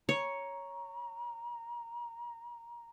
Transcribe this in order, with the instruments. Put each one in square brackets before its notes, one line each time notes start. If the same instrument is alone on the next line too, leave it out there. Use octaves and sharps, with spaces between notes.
[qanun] C#5 [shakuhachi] A#5